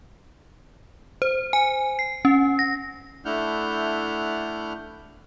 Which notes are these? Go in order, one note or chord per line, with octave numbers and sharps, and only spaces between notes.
C5
G#5
C7
C#4
A#6
A3 D4 E4 F#5 F6 G6